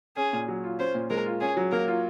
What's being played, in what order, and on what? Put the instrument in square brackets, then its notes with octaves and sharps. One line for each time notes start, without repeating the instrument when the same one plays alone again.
[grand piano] C#4 [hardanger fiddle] G#4
[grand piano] A#2
F#3
F4
[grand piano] C#4 [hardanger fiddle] C5
[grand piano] A#2
[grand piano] G#3 [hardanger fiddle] A#4
[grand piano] F4
[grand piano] C#4 [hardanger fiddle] G#4
[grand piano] F#3
[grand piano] A#3 [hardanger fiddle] A#4
[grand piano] F4